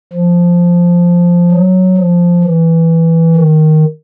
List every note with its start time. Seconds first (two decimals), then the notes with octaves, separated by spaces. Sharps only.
0.13 F3
1.51 F#3
1.97 F3
2.44 E3
3.36 D#3